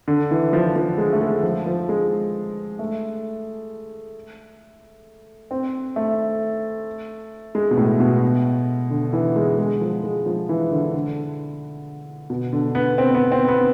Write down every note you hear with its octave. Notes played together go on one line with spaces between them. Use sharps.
D3
E3
F3
F3
G#3
A3
G#3
F3
F3
G#3
A3
C4
A3
G#3
B2
A2
B2
D3
E3
G#3
G#3
F3
G#3
F3
E3
D3
D3
B2
D3
B3
C4
B3
C4
B3